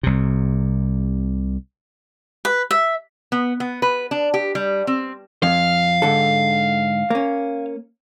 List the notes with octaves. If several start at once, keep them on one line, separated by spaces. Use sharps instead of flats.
C2 C3
B4
E5
B3
B3
B4
D4
G4
G3
C4
F2 F5
G#2 D3 A4
A#3 C#4